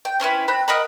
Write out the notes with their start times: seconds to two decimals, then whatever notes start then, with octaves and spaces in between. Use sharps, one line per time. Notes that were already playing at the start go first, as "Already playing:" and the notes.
0.05 G5
0.20 C4 C#4 E4 B4
0.48 C4 B5 F#6
0.68 A#4 D#5 F#5 B5